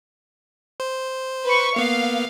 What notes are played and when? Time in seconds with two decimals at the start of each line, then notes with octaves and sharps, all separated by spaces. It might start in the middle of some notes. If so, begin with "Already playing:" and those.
0.80 C5
1.45 B4 C#6
1.76 A#3 B3 F5